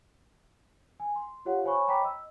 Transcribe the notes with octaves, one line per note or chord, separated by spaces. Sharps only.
G#5
C6
F4 G4 C#5 F5 F#5
C5 C#5 G#5 B5 C#6
C#5 G5 A#5 B5 D6 B6
D#5 E6